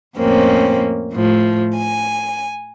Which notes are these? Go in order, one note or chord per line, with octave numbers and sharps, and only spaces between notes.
F2 A2 A#3 C4 C#4
A2 F3
G#5